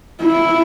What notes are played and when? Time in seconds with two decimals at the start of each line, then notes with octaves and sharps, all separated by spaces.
0.23 E4